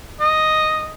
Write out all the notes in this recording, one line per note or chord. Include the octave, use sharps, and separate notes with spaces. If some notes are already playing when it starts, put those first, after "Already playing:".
D#5